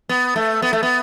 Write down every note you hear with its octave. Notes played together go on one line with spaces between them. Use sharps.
B3
A3
B3
A3
B3